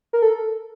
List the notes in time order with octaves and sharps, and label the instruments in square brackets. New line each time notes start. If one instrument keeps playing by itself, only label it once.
[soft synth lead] A#4
A4